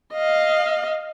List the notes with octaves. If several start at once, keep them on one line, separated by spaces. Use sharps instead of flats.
D#5 F5